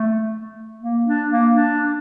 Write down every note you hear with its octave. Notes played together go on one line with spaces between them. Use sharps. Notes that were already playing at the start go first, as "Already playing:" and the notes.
Already playing: A3
A#3
D4
A#3
D4